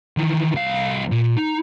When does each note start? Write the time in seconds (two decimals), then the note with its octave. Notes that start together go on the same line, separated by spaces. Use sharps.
0.17 D#3 E3
0.55 C2 F5
1.12 A#2
1.37 D#4